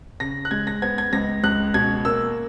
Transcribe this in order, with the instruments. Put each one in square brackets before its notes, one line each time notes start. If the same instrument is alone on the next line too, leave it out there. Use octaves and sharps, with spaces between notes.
[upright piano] C#3 A#6
F#6
G#3 G#6
A#6
B3 G#6
G#6
C#2 A#6
C#2 F#6
B2 G#6
A#3 E6